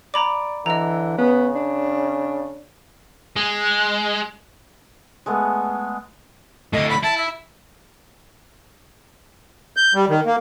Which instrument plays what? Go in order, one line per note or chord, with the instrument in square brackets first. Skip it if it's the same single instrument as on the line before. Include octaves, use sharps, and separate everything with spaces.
[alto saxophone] D5 [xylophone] A#5 B5 D6
[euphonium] D3 [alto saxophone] E3 [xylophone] D#5 A#5
[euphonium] C#3 [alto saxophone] B3
[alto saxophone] D4
[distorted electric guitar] G#3
[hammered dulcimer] G#3 A3 B3
[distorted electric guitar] A2 D3 [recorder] D#5
[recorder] B5
[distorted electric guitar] E4 [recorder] A5
[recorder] E5
[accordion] G6
G3
D#3
A#3